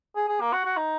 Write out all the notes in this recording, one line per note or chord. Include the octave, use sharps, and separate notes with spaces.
G#4
G#4
A#3
F#4
F#4
D#4